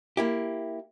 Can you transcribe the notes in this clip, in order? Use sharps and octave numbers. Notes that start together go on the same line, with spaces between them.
A#3 E4 G4